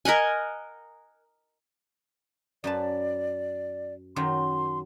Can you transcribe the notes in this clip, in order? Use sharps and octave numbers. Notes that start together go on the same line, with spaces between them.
A#4 D#5 F#5 G#5
F#2 B4 D5 A5
F#2 D#3 F#3 C6